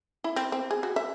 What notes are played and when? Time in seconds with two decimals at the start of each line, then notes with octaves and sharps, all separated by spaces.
0.24 E4
0.36 C4
0.52 C4
0.71 G#4
0.83 F#4
0.96 E5